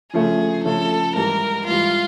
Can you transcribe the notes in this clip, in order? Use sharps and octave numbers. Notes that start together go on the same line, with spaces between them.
C#3 F3 A3 G#4
C#3 F3 A3 A4
G#2 E3 G3 A#4
G#2 E3 G3 F4